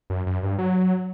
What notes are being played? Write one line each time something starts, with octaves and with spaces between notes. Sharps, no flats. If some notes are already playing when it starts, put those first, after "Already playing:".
F#2
F#2
G2
F#3